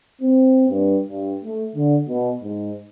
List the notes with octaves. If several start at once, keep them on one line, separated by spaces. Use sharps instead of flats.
C4
G2
G2
A3
D3
B2
G#2